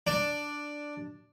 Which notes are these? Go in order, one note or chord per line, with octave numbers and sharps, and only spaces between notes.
D4